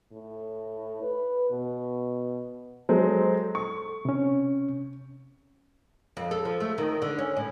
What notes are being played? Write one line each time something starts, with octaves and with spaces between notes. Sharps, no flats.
A2
B4
B2
F#3 G#3 A4 C5
C#6
C3 C#4
F2
A4
F3
A3
D#3
D3
C#4
A2